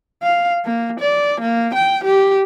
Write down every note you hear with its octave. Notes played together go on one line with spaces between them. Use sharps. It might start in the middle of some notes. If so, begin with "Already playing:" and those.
F5
A#3
D5
A#3
G5
G4